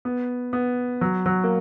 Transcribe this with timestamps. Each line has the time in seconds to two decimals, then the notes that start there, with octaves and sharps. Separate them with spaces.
0.05 B3
0.53 B3
1.01 F#3
1.26 F#3
1.44 A#3